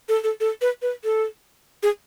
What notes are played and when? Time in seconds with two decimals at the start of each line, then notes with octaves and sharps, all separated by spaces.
0.09 A4
0.24 A4
0.40 A4
0.61 B4
0.82 B4
1.04 A4
1.83 G#4